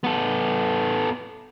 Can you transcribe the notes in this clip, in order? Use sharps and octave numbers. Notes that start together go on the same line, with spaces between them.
B3 A4